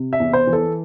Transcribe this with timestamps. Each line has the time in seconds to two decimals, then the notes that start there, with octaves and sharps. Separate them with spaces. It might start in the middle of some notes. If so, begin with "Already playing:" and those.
Already playing: C3
0.13 E5
0.20 E2
0.33 C5
0.47 E3
0.53 A4